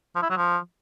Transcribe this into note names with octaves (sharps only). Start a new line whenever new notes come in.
F3
E4
F#3
F3